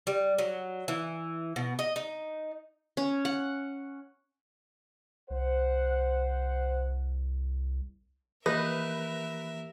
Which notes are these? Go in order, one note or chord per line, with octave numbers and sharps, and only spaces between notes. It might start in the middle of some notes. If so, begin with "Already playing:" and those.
G3
F#3
E3
B2
D#5
D#4
C#4
F#5
C2 C5 F#5
E3 A#3 D#4 G4 A#4 B4 E5